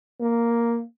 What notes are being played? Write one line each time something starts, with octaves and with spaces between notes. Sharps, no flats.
A#3